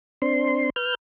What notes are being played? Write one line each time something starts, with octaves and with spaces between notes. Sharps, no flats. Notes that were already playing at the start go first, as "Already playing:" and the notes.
C4 D4 C6
B4 F6 G6